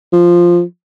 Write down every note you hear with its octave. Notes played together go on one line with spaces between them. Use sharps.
F3